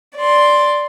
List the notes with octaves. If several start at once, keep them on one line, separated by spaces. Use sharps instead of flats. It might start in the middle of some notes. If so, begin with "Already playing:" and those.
D5 C6